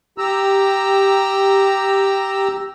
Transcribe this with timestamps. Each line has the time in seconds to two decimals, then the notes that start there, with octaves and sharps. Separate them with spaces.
0.18 G4 A#5 E6